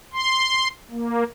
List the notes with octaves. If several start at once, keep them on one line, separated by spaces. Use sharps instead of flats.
C6
A#3